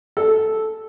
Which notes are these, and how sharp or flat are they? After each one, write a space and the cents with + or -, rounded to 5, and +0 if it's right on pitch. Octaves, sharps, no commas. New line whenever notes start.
A4 -10